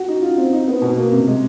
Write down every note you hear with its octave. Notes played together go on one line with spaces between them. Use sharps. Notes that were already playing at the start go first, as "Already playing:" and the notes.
Already playing: F#4
D#4
F4
C4
D#4
B3
B2
A#3
C3
G#3